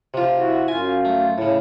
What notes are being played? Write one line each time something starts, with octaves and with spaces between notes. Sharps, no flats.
C3 F4
E4 F#4
F#2 F4 G#5
A3
A2 C#3